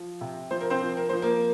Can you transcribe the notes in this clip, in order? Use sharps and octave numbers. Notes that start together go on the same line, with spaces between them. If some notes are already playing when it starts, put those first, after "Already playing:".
Already playing: F3
C3
F3 C5
A#4
C4 C5
F3
A#4
F3 C5
A#3 A#4